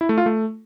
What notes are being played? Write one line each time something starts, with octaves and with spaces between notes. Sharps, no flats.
E4
A3
F4
A3